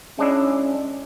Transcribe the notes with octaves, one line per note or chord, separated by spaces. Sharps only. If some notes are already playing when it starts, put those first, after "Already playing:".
G#3 C#4 D4 E4